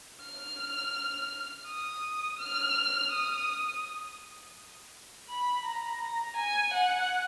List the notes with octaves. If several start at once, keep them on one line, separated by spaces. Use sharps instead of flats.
F6
D#6
F6
D#6
B5
A#5
A#5
G#5
F#5